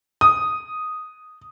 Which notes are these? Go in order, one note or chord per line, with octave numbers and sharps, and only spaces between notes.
D#6